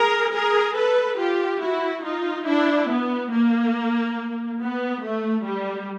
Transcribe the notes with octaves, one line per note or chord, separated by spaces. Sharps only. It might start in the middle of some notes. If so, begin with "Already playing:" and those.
Already playing: G#4 A#4
G#4 A#4
A4 B4
F4 G4
E4 F#4
D#4 F4
D4 E4
B3
A#3
B3
A3
G3